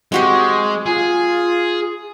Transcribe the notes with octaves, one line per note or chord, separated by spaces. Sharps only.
G#3 C4 F#4 G4
F4 G#4